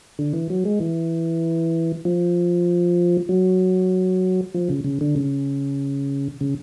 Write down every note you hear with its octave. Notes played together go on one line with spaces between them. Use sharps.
D3
E3
F#3
G#3
E3
F3
F#3
F3
C#3
C#3
D3
C#3
C#3